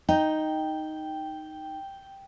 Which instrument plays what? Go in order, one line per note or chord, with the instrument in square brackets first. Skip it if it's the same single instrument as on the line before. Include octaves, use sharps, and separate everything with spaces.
[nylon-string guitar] D#4 [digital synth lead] G5